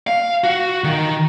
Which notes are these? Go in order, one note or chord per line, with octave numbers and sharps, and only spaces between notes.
F5
F#4
D#3